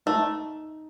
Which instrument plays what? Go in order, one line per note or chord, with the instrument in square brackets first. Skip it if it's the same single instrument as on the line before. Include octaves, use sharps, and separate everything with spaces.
[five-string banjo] A3 [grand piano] D#4